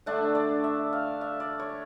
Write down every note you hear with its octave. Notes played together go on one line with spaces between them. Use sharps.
D3 A3 D4 E5
D5
E5
F5
E5
D5
C#5